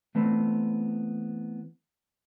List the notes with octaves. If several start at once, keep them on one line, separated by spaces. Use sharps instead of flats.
E3 A3 B3 C4